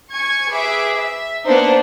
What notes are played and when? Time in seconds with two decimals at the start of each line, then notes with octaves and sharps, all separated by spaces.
0.12 G#5 C#6 G#6
0.52 G#4 B4 E5 D6
0.94 E5
1.45 A#3 B3 D4 D#4 C5